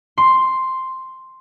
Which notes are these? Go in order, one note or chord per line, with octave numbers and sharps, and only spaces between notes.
C6